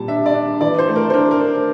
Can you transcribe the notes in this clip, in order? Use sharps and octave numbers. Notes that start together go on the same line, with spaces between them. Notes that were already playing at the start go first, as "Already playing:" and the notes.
Already playing: A#2 G3 A5
D4 E5
D5
D4
E3 D5
C5
A3
A#4
C5
D4 A#4
A#4
D4